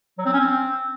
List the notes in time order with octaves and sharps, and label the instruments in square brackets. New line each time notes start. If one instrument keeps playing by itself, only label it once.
[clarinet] F#3
C4
C#4
C4